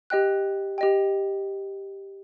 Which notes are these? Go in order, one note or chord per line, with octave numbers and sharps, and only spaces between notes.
G4 D#5 G5 F#6
G4 D#5 G5